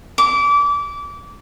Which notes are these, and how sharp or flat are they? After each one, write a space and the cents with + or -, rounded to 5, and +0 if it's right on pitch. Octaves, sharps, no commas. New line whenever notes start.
D6 -25